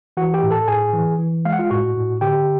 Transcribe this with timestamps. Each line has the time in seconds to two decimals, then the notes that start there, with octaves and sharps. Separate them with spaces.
0.17 E3 F#4 F#5
0.34 G4 G5
0.43 A2
0.51 A4 A5
0.68 A2 G#4 G#5
0.93 E3
1.19 E3
1.45 G#3 F5
1.53 F#5
1.59 F4 F5
1.70 A2 F#4 F#5
1.96 A2
2.21 D3 G4 G5